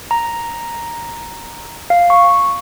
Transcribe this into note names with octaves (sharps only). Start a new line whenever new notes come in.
A#5
F5
C#6